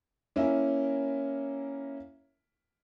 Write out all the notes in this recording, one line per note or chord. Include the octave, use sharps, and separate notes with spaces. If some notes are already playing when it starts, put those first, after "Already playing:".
A#3 C#4 E4 A#4 E5